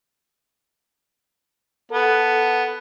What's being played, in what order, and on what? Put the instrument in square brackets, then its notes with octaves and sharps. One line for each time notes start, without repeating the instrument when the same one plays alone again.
[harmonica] B3 [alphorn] A4